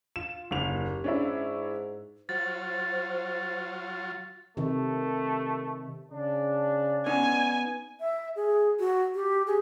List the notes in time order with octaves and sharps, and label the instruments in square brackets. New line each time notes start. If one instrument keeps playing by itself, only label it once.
[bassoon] F4 [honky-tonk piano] E7
[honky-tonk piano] F#1 F7 [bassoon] D#2
[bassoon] G#2 [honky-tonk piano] C#4 D4 E4
[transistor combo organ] F#3 F4 [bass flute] C5 [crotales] A6
[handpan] C3 D#3 [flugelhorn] A3
[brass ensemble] C#3 D4 [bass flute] D5
[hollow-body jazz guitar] B3 C#4 D#4 [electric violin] G#5
[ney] E5
G#4
F#4
G4
G#4